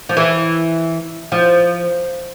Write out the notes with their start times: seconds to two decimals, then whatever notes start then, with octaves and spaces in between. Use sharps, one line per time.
0.09 F3
0.17 E3
1.32 F3